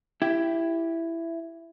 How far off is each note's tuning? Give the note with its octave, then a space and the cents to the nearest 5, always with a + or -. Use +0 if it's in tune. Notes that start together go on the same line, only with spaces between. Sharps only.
E4 +10 G4 +0